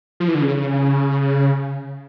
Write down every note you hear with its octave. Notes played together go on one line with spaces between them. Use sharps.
F3
E3
D3
C#3